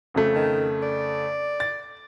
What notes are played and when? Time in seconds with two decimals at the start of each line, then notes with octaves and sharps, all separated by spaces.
0.14 F2 C#3 A3
0.35 D#3
0.82 D5
1.60 A6